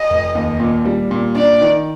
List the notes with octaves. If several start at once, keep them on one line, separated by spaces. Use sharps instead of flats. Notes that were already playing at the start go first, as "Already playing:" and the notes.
Already playing: D#5
F1
D#2
A#2
G3
A#2
D4 D5
D#3